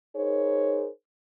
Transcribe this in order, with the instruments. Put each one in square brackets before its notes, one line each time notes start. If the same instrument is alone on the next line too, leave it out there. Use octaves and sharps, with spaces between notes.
[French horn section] D#4 G#4 A#4 C5 C#5